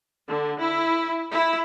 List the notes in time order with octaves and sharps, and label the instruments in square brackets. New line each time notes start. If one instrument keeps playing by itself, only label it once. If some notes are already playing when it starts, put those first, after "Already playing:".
[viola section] D3
E4
E4